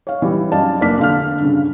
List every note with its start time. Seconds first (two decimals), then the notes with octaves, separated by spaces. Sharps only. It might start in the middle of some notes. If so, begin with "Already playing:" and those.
0.07 C#5 F5
0.22 E3 G3 E4
0.52 F#2 D#4 D5 F5 A5
0.81 F1 A#3 D4 D5 F6 B6
0.99 D3 F5 F6
1.40 G2 C#3